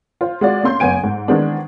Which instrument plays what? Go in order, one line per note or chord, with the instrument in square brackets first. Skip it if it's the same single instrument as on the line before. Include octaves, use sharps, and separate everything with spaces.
[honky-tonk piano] F4 C5
G#3 F4 F#4 D5
A#3 C#4 C6 G6
F#1 B3 G#5 D7
G#2
D#3 E3 G#3 B3 C4 D4